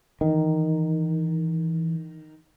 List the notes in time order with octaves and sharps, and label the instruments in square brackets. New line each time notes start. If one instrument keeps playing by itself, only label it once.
[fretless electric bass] D#3 [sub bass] E3